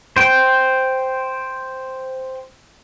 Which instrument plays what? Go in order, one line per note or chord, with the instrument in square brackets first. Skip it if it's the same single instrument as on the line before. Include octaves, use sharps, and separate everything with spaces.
[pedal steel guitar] C5 G5